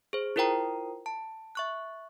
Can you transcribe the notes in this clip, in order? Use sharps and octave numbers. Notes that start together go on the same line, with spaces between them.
G#4 C5
E4 F4 A#4 C5 G5 A#5
A5
E5 C#6 F#6